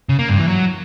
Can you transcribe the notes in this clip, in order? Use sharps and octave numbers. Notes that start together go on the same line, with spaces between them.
C#3
A#3
G2
E3
F#3